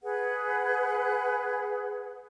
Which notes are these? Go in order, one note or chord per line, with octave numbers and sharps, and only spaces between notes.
G#4 B4 F#5